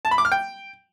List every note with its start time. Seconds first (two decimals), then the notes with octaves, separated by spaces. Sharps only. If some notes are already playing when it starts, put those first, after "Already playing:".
0.05 A5
0.11 B5
0.18 D6
0.25 F6
0.32 G5